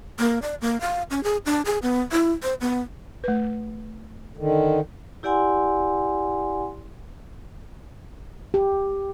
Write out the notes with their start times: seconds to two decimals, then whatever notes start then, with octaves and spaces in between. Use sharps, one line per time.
0.19 A#3
0.42 D5
0.61 A#3
0.81 F5
1.10 C#4
1.24 G#4
1.46 D4
1.65 G#4
1.82 B3
2.12 E4
2.43 C5
2.61 B3
3.24 A3 B4
4.37 D3 D#3
5.23 E4 G4 D5 F#5 G#5 C6
8.54 G4